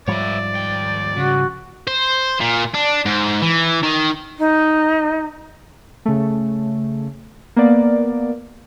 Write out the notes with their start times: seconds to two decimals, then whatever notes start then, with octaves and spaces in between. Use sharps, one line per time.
0.08 G#2 F3 G3 C#5 D5 E5
0.55 D#2 G5
1.17 C#3 F#4
1.87 C5
2.41 A#2
2.74 D4
3.06 G#2
3.42 E3
3.83 D#3
4.38 D#4
6.05 C#3 A3
7.56 A#3 B3 D5